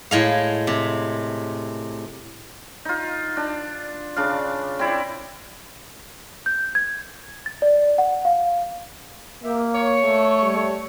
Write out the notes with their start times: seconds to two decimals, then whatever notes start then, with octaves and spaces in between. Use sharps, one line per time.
0.11 A2 G#3 F5
0.67 C3
2.85 D#4 F4
3.37 D4
4.16 C#3 D4 F5
4.79 C4 E4 D5
6.46 G6
6.75 G#6
7.46 A6
7.62 D5
7.98 F#5
8.25 F5
9.44 A#3 G4 E5
9.74 C#5
10.06 A3
10.41 G3